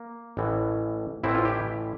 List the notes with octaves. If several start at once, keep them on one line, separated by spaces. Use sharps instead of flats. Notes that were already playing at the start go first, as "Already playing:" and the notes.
Already playing: A#3
A1 A2 E3
A1 A2 E3 C4 E4
F4
E4 G4